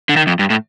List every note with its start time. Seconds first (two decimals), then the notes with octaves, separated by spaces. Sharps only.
0.09 D3
0.16 D#3
0.27 F2
0.39 G2
0.50 A2